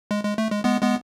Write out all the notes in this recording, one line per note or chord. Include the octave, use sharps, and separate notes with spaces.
G#3
G#3
A3
G#3
G#3 B3
G#3 B3